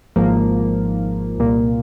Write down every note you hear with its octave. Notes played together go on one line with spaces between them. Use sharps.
G#1 G#2 F3 A#3
C2 A#2 A#3